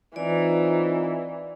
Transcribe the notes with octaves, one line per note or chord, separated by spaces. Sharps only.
E3 C4 D#4 F4 D5